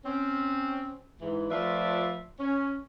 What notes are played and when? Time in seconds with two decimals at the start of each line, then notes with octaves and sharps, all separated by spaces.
0.05 C4 C#4
1.21 G#2 E3
1.50 F3 A3 F4 B4 D5 E5
2.40 C#4